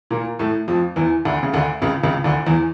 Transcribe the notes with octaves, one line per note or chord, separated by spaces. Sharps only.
A#2 A#3
A2 A3
F2 F3
E2 E3
D2 D3
C#3
D2 D3
C#2 C#3
C#2 C#3
D2 D3
E2 E3